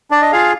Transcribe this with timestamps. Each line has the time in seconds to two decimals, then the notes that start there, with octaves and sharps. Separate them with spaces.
0.11 D4 D5
0.22 D#5
0.32 F4 G#4 F5